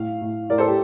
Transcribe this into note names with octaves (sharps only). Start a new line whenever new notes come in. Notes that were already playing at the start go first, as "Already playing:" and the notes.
Already playing: A2 F5
A2
A2 A#4 D5
A4 C5
G4